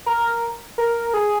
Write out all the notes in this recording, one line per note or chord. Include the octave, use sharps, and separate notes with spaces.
A#4
A#4
G#4